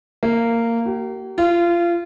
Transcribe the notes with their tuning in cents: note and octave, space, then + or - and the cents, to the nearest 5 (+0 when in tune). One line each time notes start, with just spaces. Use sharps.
A#3 -15
G4 -45
F4 -25